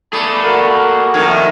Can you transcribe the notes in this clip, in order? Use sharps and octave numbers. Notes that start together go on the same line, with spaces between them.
A3 G#4 D5 B5
A#3 F#4 A#4
F2 A2 D#3 G#6
E5